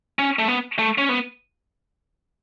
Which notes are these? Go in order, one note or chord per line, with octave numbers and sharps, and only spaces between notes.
C#4
A3
B3
A3
C#4
B3